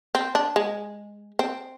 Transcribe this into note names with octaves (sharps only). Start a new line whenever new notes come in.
C4
D4
G#3
C4